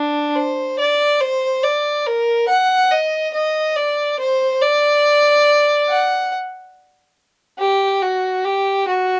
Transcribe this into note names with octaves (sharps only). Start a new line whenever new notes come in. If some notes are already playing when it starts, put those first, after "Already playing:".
Already playing: D4
C5
D5
C5
D5
A#4
F#5
D#5
D#5
D5
C5
D5
F#5
G4
F#4
G4
F#4